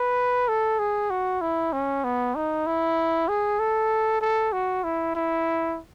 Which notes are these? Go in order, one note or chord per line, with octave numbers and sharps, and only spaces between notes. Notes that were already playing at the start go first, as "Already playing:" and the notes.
Already playing: B4
A4
G#4
F#4
E4
C#4
B3
D#4
E4
G#4
A4
A4
F#4
E4
E4